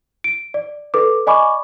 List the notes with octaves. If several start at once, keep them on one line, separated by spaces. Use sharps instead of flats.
D7
D5
A4 B4 D6
D5 D#5 G#5 B5 C#6 D6